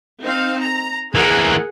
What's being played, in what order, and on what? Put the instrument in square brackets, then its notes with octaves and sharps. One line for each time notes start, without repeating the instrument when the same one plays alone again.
[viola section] C4 D#4 F5
A#5
[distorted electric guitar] E3 A#3 [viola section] G#4 A#4 F#5